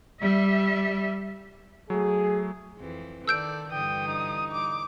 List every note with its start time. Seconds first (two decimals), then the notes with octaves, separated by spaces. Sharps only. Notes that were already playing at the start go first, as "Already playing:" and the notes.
0.22 G3 E5
1.90 F#3 A3 G#4
2.78 F2 E3
3.28 D#3 A4 D5 E6 G6 D7
3.71 G2 D3 E3 G5 D#6
4.07 D#4
4.52 D6